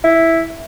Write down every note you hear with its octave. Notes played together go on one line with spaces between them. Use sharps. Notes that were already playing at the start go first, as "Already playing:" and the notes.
E4